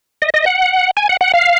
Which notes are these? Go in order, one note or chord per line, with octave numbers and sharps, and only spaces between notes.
D#5
D#5
F#5
G#5
F#5
F#5
F5